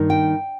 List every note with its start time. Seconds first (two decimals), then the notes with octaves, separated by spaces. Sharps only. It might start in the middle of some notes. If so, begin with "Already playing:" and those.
Already playing: G2 D#3 A#3
0.10 G5